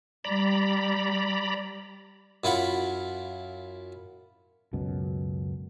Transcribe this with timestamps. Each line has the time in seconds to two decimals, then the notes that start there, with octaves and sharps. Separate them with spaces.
0.25 G3 D5 A#5 B5
2.44 F#2 E4 F4 F#5 B5
4.73 C#2 F#2 B2